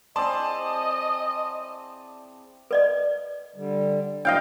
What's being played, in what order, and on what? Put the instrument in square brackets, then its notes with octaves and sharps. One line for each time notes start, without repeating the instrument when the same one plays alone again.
[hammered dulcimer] C4 E4 G#4 [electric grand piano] D5 A5 C6 [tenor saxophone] D#5
[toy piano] B4 D5 D#5
[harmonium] D3 G3
[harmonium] B2 F#3 D4 [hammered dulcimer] D#5 F5 G5